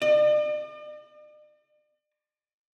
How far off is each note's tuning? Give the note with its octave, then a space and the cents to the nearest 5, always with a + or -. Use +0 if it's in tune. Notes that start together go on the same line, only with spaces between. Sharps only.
D5 +45